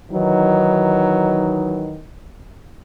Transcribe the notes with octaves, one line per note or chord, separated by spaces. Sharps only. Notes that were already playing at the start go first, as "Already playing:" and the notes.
D#3 E3 F#3 D#4